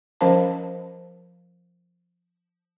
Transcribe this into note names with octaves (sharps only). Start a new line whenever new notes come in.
F3 C#4 A#4 C5 F5 A5